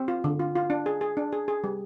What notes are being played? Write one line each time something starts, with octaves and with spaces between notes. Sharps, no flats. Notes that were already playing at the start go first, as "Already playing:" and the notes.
Already playing: C4
F4
D3
F4
F4
D4
G#4
G#4
D4
G#4
G#4
G3